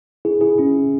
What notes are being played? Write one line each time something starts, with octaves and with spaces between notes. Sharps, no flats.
E4 G#4
E4 G#4
C#4 E4